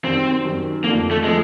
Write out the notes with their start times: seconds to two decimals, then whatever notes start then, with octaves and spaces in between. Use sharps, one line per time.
0.05 F#2 D#3 G3 C4
0.45 F#2 D#3 G3
0.84 F2 D3 F3 A3 A#3
1.11 A3
1.24 D3 F3 G#3 A3